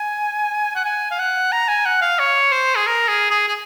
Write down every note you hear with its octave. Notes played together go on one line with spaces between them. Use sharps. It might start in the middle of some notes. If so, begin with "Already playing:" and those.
Already playing: G#5
F#5
G#5
F5
F#5
A#5
G#5
F#5
F5
C#5
C5
G#4
A#4
G#4
G#4
G#4